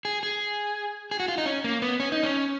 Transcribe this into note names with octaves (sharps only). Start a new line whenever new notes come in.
G#4
G#4
G#4
F#4
F4
D#4
C#4
A#3
B3
C#4
D#4
C#4